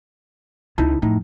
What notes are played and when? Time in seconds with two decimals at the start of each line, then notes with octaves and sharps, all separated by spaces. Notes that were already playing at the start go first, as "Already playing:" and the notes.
0.78 C#2 D#4 E4 A5
1.02 F2 A2 D#4